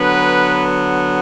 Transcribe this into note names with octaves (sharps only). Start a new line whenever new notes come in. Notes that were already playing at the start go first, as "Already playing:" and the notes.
Already playing: D3 F#3 B3 B4